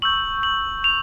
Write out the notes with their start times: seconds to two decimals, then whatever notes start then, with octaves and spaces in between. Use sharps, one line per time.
0.02 C#6 E6 G6 F#7
0.43 F#7
0.84 F7